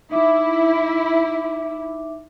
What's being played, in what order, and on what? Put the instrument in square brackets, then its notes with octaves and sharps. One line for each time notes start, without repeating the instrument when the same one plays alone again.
[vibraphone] D#4 E5 D6 [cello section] E4